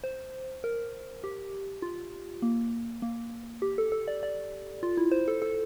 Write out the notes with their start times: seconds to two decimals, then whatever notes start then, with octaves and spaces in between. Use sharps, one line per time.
0.04 C5
0.64 A#4
1.24 G4
1.82 F4
2.42 A#3
3.02 A#3
3.62 G4
3.78 A4
3.92 A4
4.08 D5
4.23 D5
4.83 F4
4.97 E4
5.12 C5
5.28 A4
5.42 A4